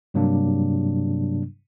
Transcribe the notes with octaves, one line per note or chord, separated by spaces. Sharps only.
G2 C3 F#3 G3 A#3 D4